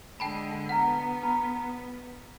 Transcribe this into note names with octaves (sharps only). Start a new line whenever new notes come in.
D3 G#3 G5 A5 B5
B3 B4 F#5 A#5
B4 A#5 B5